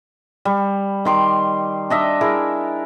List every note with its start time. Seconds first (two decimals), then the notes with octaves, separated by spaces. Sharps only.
0.45 G3
1.05 D#3 C6 D6
1.90 D4 D#5 E5
2.21 E4 G#4 A#4